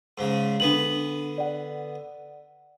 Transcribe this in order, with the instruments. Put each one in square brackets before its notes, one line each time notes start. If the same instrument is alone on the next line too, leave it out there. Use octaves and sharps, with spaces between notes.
[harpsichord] G#2 C#3
[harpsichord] D3 B3 [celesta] D4 F#7
[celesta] D5 F#5